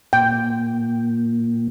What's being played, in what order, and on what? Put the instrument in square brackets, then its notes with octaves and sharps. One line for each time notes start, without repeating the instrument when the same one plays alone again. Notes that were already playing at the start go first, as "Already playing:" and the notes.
[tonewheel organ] A#2 [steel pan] G5